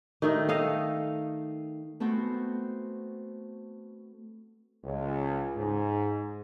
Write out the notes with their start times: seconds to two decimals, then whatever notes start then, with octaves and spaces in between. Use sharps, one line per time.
0.22 D#3 A3 D#4
0.49 A4 D#5 F5
2.00 A3 B3 C4 F#4 C5
4.84 C#2
5.56 G#2